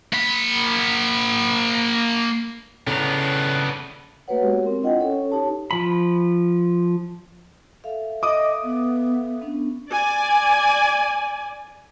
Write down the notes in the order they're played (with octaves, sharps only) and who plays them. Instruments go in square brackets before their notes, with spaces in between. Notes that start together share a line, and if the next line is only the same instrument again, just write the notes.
[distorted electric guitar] A#3 B5
[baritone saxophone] A2 [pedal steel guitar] C#3 A#5 [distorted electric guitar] B3 D4
[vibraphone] A3 A#3 F#4 B4 C#5 F#5
G#3 B3 F#4 G4 C#5
C4 A#4
D4 E4 F4 D#5 F#5 G5
C#4 A4 C#5
D#4 G4 C#5 A5
[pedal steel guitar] F3 B5
[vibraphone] A4 E5 F5
[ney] D#5 [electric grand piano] D6 D#6
[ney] B3
[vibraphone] B3 C#4 D4
[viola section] D5 G#5